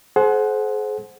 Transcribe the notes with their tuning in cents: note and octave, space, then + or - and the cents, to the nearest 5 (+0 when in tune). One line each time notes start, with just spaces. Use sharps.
G#4 +40 C5 +0 F#5 +0